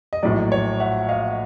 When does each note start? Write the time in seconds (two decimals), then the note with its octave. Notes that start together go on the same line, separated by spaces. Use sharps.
0.13 D#5
0.23 A#1 A2 F#3 D5
0.52 C#5
0.80 E5 F#5
1.09 D#5 F5